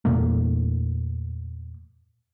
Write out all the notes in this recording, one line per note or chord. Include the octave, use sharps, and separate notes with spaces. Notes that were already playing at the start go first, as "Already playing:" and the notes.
E2 A#2 A3 A#3